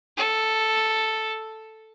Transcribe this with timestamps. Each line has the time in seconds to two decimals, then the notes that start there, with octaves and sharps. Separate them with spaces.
0.17 A4